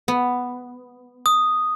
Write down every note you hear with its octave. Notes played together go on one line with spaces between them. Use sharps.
B3
D#6